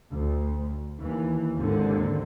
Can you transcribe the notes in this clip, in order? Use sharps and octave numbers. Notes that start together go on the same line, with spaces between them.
D2
D#2 E3
G#1 D#2 G#2 D3 C4